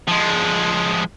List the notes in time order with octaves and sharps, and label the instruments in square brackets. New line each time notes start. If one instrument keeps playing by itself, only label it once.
[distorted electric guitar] F3 G#3